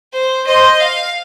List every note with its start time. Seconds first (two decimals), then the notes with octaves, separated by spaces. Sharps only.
0.13 C5
0.46 C5 D#5
0.80 F5